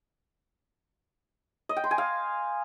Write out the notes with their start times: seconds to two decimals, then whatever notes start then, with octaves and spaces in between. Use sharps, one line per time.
1.69 D#5
1.77 G5
1.84 C6
1.91 G#5
1.98 F5